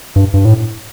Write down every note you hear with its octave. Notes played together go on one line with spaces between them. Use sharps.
G2
G2
A2